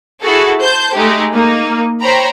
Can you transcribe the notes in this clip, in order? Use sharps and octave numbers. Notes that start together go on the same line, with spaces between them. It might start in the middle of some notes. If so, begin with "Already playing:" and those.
E4 F#4 G#4 A4
C5 A5 G6
G#3 A3 D#4 G4
A#3 D#4
C5 C#5 G5 A#5 B5